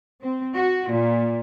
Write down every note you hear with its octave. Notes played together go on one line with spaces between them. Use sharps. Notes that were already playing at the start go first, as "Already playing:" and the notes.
C4
F#4
A#2